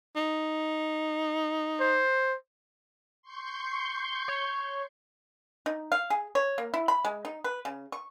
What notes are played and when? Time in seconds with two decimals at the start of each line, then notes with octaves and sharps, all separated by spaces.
0.16 D#4
1.81 C5
3.22 C6 C#6 G6
4.28 C#5
5.66 D#4
5.92 F5
6.10 G#4
6.35 C#5
6.58 A#3
6.74 E4
6.88 B5
7.05 G#3
7.25 D#4
7.44 B4
7.65 C#3
7.92 C#6